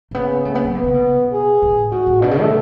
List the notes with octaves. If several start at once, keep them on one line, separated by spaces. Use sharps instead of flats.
A3
C#3 B3
A3
B3
F#3
D3 B3
C#3
B2
G#4
A2
G#2 F#4
A2
B2 D4
C#3
A3